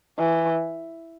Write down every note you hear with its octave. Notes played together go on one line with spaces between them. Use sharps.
E3